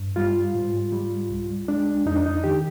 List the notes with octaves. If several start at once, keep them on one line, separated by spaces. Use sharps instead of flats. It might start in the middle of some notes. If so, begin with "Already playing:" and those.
Already playing: G2
G3 F4
G#2
G3
C2
G#3 D4
F2 D#4
D4
D#4
D#3 G4